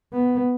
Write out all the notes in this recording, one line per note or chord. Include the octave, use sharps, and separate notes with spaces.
B3